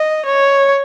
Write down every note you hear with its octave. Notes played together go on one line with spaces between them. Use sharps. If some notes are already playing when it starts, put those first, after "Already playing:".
Already playing: D#5
C#5